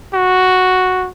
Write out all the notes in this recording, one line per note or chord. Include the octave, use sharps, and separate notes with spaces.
F#4